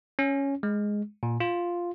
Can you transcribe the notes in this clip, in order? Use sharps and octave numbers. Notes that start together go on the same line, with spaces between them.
C#4
G#3
A#2
F4